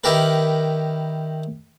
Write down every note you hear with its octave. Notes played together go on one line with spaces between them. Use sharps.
D#3 E4 G4 A#4 B4